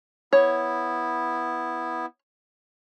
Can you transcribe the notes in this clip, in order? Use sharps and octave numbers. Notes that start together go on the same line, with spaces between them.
B3 E4 C#5